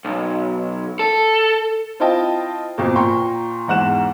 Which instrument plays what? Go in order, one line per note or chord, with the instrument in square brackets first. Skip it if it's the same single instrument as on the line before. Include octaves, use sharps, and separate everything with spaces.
[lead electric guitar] B1
A4
[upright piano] C4 E4 F4 D#5 G5 A5
F2 B2 A#3
A#2 G5 A#5 C6 C#6
E2 G#2 F#5 F#6 E7